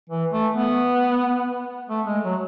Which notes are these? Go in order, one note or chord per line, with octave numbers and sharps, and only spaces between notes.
E3
A3
B3
A3
G#3
F#3